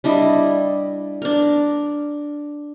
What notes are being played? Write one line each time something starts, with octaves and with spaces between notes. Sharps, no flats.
G3 D4 E4 D#5
D4 A#4